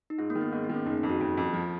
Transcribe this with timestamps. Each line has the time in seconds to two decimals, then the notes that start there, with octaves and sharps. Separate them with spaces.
0.10 D#4
0.18 G#2 F4
0.30 A#3
0.35 D#3
0.41 B3
0.52 G#2 A#3
0.64 B3
0.69 D#3
0.75 C#4
0.86 F#1 D#4
0.98 D#4
1.03 F2
1.09 F#4
1.20 F2 F4
1.37 F2
1.53 F3